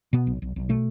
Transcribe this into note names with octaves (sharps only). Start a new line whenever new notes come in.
B2 B3
B1
B1
B1
B2 A3